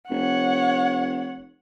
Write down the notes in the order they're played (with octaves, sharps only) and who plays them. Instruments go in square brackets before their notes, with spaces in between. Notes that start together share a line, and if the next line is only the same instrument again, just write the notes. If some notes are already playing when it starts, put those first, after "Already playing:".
[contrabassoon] F1 [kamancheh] C#5 F#5